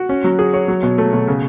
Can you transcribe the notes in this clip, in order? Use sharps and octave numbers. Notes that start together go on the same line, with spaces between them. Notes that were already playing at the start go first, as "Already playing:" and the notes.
Already playing: F#4
C#4
F#3
G#4
C#5
F#3
B2
A3
B2
C#3